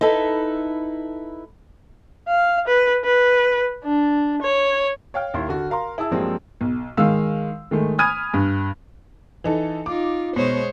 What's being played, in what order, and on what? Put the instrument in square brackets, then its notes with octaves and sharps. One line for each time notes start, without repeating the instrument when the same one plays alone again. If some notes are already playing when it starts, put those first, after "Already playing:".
[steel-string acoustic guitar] D#4 E4 A4 B4
[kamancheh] F5
B4
B4
D4
C#5
[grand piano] C#5 F5 G5 F6
D#2 E4 C6
D3 F#4
A#4 F5 A#5 C6
E4 G#4 A5 E6
G2 F3 F#3 G#3 A#3 C4
[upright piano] B1
D#3 G#3 F5 E6
D#3 G#3 A3
G#5 B5 D#6 F6 G#6 D#7
G2
[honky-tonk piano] E3 D#4 A4
[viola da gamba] D#4 F4 [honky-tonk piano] D6
[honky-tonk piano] B2 [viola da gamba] G#3 C5 C#5